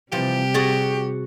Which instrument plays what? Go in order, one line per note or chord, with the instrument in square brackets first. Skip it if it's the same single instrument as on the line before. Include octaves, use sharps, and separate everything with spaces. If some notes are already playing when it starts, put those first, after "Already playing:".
[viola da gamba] C3 G3 [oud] E3 F3 [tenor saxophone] G4
[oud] F#4 G#4 D5